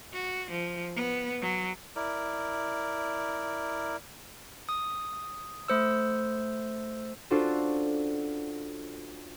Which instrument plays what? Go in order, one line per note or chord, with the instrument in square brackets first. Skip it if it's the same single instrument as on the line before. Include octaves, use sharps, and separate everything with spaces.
[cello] F#4
F3
B3
F#3
[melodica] E4 A#4 D5
[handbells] D#6
A3 C5 E6
[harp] C#4 D4 F4 F#4 A4 C5